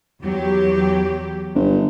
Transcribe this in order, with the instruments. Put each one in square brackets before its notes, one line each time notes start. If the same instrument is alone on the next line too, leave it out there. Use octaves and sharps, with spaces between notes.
[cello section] E2 F#3 G4
[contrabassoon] G1